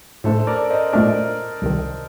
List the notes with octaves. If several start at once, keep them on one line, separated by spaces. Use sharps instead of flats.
A2 A3 D4 A4 C5
A#4 D5
C5 D#5
A#2 A3 D4 A#4 D5
C2 C3 D#3